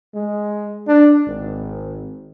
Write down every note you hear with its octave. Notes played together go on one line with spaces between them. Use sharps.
G#3
D4
G#1